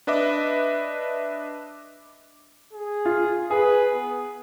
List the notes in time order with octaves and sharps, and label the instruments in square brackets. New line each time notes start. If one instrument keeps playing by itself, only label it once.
[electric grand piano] D4 B4 D#5 E5 D6
[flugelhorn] G#4
[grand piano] F4
[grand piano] G#4 [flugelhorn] B4
[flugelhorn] B3